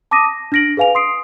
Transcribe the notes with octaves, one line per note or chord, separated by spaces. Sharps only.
A5 D6 D#6 A#6 D#7
A#6
D4 F6 A#6 D7 F#7
G#4 B4 F5 G#5 F7
C6 D#6 C7 D7